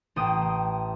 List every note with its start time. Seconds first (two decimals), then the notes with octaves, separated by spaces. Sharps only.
0.16 A1 G5 D#6 E7